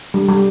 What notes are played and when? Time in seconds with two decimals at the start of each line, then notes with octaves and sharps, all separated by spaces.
0.14 G3
0.29 G3